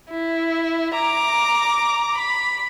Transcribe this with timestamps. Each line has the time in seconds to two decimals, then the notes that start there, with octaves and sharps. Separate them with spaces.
0.11 E4
0.94 A#5 D6
2.18 B5